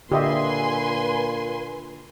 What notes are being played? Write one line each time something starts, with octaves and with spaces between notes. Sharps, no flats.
A#2 D3 G4 B4 D#5 E5 G#5 C6